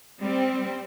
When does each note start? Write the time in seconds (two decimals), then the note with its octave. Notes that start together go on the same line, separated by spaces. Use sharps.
0.19 G3 C4